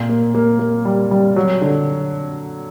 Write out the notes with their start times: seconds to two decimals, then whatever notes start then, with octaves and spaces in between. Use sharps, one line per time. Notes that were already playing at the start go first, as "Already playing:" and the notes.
Already playing: A#2
0.09 A#3
0.35 A#3
0.59 A#3
0.85 G3
1.11 G3
1.36 F#3
1.61 D3